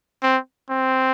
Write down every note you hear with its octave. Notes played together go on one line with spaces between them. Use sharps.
C4
C4